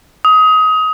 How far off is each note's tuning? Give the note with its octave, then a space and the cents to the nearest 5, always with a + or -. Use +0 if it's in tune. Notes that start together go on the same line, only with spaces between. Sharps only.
D#6 +25